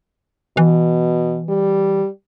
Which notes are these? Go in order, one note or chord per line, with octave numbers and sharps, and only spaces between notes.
B2 E3
G3